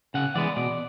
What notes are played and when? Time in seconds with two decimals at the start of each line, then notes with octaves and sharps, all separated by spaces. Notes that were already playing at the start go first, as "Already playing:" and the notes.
0.14 C#3 F#5
0.35 E3 G#3 B3 D5
0.56 B2 D5